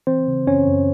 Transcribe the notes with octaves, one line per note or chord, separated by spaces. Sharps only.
E3 C4 C5
C#3
F#2 C#4 C#5
F#2